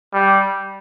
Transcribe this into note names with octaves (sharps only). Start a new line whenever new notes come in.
G3